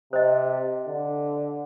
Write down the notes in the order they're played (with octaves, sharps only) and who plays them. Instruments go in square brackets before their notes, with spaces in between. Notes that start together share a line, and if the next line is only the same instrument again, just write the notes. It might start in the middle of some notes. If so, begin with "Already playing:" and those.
[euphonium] C3 [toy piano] C5 D#5
[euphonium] D3